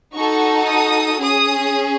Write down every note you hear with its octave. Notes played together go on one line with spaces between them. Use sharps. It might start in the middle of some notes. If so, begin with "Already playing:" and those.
D#4 F#4 A4 C#6
D#6
C#4 G#4 D#6